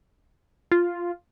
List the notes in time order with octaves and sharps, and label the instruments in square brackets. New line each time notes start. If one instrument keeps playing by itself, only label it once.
[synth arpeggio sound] F4